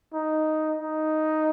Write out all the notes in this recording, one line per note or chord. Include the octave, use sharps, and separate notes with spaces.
D#4
D#4